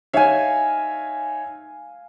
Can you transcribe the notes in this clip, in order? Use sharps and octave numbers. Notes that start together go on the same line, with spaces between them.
D#4 C#5 E5 F5 G#5